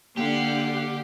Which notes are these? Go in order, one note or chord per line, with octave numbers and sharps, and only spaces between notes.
D3 A#3 G4 F5 F#5